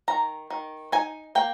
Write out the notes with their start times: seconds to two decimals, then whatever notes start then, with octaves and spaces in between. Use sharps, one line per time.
0.08 D#3 A#5
0.50 D#3
0.92 D#4 G#5
1.35 A#3 G5